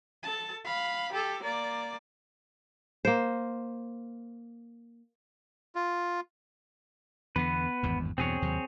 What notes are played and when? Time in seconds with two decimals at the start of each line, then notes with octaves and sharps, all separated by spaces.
0.23 A4 A5
0.65 F5 B5
1.12 G4 A4
1.43 A#3 D5
3.05 A#3 C5
5.76 F4
7.36 E2 D3 B3 B4
7.83 G#1 E2 G2
8.18 E2 G2 B2 C4 G#4 C#5
8.42 D#2 C3 F#3